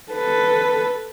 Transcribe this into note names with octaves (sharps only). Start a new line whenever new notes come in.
A4 B4